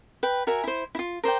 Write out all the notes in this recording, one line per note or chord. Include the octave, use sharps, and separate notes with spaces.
B4 G5
F#4 A#4 E5 G#5
E4 C5
E4 F4
A#4 C5 D5 G5